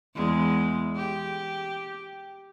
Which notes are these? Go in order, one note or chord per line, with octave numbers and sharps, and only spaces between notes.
E2 G#3
G4